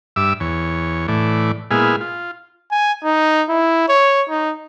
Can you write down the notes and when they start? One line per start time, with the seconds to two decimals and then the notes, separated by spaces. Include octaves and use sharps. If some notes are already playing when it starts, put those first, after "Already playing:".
0.16 G2 E5 D6 E6
0.40 E2 C#5
1.08 A2 E3 D5
1.71 A#2 G#3 B3 E4 G#4 F6
2.01 F4
2.71 G#5
3.04 D#4
3.49 E4
3.89 C#5
4.29 D#4